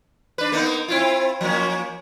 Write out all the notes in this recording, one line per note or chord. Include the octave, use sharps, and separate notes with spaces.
D4 B4
A#3 B3 D#4
C4 E4 F4
F3 A#3 C#4